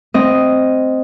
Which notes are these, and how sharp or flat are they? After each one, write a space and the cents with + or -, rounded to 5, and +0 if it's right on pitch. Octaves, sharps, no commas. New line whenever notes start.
C4 -5 D#5 +0